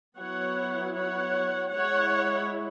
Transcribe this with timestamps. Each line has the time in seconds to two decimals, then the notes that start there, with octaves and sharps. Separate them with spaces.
0.18 F#3 B3 E4 C#5 F#5
0.94 C#5 F#5
1.71 G#3 E4 C#5 F#5